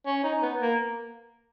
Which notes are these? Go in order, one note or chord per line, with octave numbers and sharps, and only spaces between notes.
C#4
D#4
B3
A#3